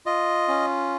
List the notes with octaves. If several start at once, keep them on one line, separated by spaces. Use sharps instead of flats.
F4 D#5
C#4